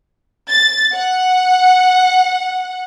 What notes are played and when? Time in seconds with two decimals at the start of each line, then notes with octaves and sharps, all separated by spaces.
0.49 A6
0.93 F#5